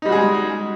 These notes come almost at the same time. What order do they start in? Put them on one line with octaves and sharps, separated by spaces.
D#4 G3 F#4 G#4 G#3